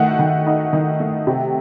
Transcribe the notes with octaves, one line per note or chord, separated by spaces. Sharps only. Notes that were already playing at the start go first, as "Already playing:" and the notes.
Already playing: D#3 A3 F#5
D#3
D#4
D#3
A3
C3